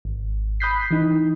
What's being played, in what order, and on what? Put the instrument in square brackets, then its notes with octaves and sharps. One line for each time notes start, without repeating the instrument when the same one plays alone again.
[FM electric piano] G#1
B5 D#6 F#6 G6 B6 C7
E3 D#4